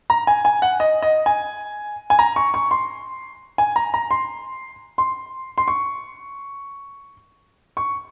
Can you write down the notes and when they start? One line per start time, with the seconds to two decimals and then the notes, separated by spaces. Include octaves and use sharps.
0.10 A#5
0.27 G#5
0.45 G#5
0.62 F#5
0.80 D#5
1.02 D#5
1.26 G#5
2.10 G#5
2.19 A#5
2.36 C#6
2.54 C#6
2.71 C6
3.58 G#5
3.76 A#5
3.94 A#5
4.11 C6
4.98 C6
5.58 C6
5.68 C#6
7.77 C#6